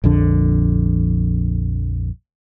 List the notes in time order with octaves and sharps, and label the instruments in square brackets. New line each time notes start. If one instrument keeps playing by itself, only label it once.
[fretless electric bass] A#1 F2 D3